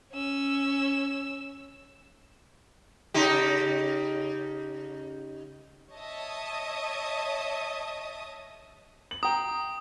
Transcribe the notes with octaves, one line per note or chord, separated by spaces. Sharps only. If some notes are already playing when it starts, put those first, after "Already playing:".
C#4 E6
C#3 D#4 G4
C#5 D#5 E5 A5 D#6
F#7
G5 A#5 D#6